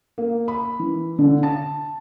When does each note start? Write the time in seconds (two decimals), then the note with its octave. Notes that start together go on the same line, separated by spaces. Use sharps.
0.18 A#3
0.48 B5
0.79 E3
1.19 D3
1.43 A5